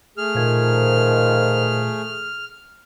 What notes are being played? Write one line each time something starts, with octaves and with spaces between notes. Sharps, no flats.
A3 G#4 F6
A#2 D#3 F3 G#6